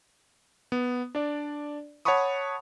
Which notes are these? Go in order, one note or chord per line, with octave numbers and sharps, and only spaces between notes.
B3
D4 D5
C#5 F#5 A5 B5 C#6 D#6